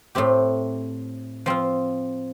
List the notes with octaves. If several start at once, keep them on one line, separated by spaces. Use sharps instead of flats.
A2 A3 C4 G4
F3 C4 F4